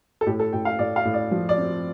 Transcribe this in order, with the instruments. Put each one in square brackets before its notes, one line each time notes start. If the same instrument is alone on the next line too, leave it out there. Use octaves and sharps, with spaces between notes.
[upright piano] A4
A2 G4
A4
A2 G5
F5
A2 D5
F5
A2
D5
F3
D5
C4